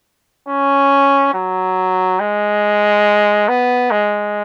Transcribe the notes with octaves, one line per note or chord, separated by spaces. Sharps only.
C#4
F#3
G#3
B3
G#3